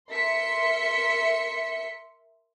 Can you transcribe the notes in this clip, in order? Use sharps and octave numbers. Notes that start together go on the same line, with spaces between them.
A#4 E5 C6 B6 C#7